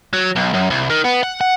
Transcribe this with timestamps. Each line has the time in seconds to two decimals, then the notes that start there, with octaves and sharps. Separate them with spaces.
0.13 F#3
0.36 B1
0.54 F#2
0.70 C2
0.90 D#3
1.04 B3
1.23 F#5
1.41 F#5